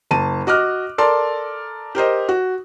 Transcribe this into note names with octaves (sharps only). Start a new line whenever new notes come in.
F#1 A5 D#7
F#4 D#5 D6 F6 F#6
A4 A#4 D5 C6
G4 A#4 C5 D#5
F#4